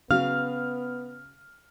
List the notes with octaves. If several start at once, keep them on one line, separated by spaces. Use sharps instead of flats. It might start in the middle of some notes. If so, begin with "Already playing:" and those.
C#3 F#3 B3 F5 F6